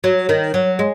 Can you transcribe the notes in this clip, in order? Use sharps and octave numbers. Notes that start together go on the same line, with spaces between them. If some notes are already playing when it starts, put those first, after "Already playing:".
F#3
D#3
F#3
G#3